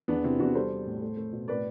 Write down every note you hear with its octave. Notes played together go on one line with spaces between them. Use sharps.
E2 B3 D4
C3 C4 E4
E2 D4 F#4
G3 A4 C5
G3
A2
A3
A3
B2
A2 B4 D5